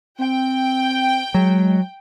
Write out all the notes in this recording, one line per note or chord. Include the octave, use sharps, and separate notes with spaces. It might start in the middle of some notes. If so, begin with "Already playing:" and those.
C4 G5
F#3 G#3